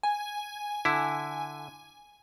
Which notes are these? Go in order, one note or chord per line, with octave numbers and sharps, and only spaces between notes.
G#5
D3 E4